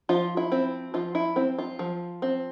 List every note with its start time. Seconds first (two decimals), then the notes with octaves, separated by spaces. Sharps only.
0.09 F3 F4
0.37 E4
0.52 C4
0.94 F3 F4
1.15 E4
1.36 C4
1.58 F4
1.79 F3
2.22 C4